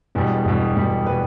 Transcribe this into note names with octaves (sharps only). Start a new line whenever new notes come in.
E1 E2 B2 G3
E1 E2 B2 G3 G4
E1 E2 B2 G3
B2 G3 B4